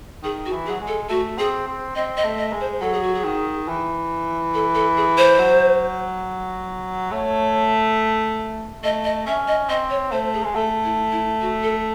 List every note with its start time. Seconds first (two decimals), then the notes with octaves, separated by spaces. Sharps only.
0.23 D#3 G#4
0.46 F#4
0.52 E3
0.66 G#4
0.69 F#3
0.81 G#3
0.88 A4
1.09 A3 F#4
1.38 C4 G#4
1.68 C4
1.95 C4 D#5
2.17 D#5
2.24 A3
2.38 D#5
2.53 G#3
2.61 C5
2.82 F#3 A4
2.93 G#4
3.03 F#4
3.15 G#4
3.24 D#3
3.68 E3
4.54 A4
4.75 A4
4.97 G#4
5.18 C5
5.39 F#3
7.11 A3 C#5
8.83 A3 D#5
9.05 D#5
9.26 C#4 E5
9.48 D#5
9.69 C4 D#5
9.90 C#5
10.12 A3 C5
10.34 G#4
10.44 G#3
10.55 A3 A4
10.84 E4
11.12 E4
11.41 F#4
11.63 A4